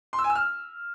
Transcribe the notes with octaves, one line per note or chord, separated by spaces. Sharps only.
C6
E6
G#5
E6
F6